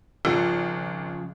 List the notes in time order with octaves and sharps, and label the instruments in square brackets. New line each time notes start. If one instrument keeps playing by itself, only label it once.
[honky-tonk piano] G#1 [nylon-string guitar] C#3 F3 F4